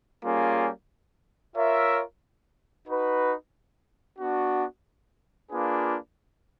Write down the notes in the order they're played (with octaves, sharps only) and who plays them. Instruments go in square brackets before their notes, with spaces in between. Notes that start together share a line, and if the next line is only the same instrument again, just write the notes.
[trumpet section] G3 A#3 C#4 F4 G#4
F4 A#4 C#5 E5
D#4 F#4 B4
B3 D4 F#4
A#3 D4 F4 G#4 B4